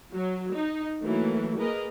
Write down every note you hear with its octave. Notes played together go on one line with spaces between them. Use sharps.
F#3
D#4
E3 F#3 A3 A#3
A#3 G#4 A#4 B4 D#5 A#5